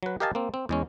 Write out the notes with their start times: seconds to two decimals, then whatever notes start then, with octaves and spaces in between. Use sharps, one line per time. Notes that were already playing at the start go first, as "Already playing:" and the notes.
0.03 F#3 B4
0.20 G4 A#4 D#5 F5 G#5 A5
0.35 A#3 C4
0.54 C4
0.69 E2 G#3 C#4